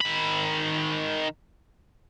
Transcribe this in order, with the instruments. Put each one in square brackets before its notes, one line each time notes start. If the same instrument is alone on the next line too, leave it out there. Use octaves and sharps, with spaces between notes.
[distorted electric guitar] D#3 B5